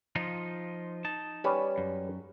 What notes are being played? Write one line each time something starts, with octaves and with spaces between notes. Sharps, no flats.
F3 D#4 F4
D#4 A5
G3 C#4 B4
F#2